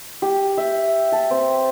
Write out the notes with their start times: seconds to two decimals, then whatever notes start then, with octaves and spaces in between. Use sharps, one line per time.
0.22 G4
0.57 E5
1.12 A5
1.31 C4